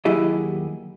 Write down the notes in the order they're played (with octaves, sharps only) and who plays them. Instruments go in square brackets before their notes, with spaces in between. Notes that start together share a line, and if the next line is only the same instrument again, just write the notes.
[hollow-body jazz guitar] D#2 F#3 E4 G4 G#4 D#5